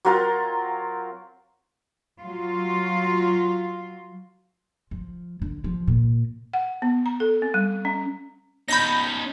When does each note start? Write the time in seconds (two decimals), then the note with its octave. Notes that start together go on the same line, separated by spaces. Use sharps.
0.05 F#3 C4 F4 A#4
2.24 F#3 F4
4.91 F3
5.42 D3
5.64 F3
5.88 A#2
6.54 F#5
6.82 B3
7.06 A#5
7.20 A4
7.42 C4
7.54 G3
7.85 C#4
8.68 C#4 D#4 B5 G6 A#6